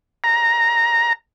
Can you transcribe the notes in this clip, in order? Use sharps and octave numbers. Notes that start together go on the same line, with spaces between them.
A#5